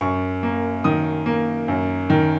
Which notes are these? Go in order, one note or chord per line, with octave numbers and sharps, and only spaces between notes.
F#2 C#6
A#3
D#3 D#6
A#3
F#2
D#3